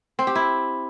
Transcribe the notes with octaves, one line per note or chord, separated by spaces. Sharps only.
C4
G4
E4